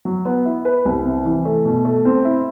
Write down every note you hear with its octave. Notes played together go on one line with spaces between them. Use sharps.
F#3
B3
E4
B4
C2
C3
E3
A3
B2
A3
C4
E4